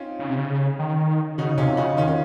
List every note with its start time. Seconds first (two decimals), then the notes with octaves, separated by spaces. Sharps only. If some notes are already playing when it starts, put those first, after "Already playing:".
Already playing: C4 C#4 D#4 F4
0.19 C#3
0.29 C3
0.38 C#3
0.79 D#3
1.38 C#3 D#4 F#4
1.58 C3 C#4 F4
1.77 C#3 D#4 F#4
1.97 D#3 C#4 F4
2.08 C#4